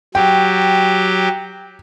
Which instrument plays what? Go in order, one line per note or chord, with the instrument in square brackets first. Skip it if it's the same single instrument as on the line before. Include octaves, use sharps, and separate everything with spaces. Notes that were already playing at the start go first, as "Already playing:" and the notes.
[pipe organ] F#3 G4 [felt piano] G5